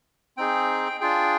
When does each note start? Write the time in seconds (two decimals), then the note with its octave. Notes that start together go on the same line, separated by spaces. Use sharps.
0.37 C4 D#4 G#4 G5
1.01 D4 F4 G#4 G5